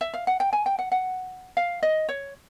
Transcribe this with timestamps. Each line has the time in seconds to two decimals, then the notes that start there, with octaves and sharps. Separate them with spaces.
0.01 E5
0.14 F5
0.27 F#5
0.40 G5
0.53 G#5
0.66 G5
0.79 F#5
0.92 F#5
1.57 F5
1.83 D#5
2.09 C#5